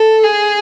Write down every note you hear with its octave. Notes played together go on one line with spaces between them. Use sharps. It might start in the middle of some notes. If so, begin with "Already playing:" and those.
Already playing: A4
G#4